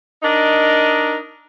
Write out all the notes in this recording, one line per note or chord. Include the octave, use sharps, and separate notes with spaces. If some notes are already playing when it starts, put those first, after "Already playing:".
D4 D#4 A#4 D#5